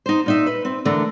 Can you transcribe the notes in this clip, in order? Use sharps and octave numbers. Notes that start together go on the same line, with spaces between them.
D#4 C5
A#2 D#4 E5
B4
C4
D3 E3 A3 A#4